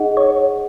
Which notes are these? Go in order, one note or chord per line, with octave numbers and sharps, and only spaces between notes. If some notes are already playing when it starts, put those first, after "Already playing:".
Already playing: D#4 G#4 D#5 F#5
C#5